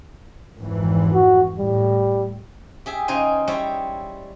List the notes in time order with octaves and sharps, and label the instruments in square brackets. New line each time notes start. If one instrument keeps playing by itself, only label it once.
[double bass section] G#1 F2 E3
[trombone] F#4
[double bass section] A2 [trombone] G3
[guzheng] G4 G#4 E5
C#3 D#4 C5 G#5
G3 E4 C5 C#5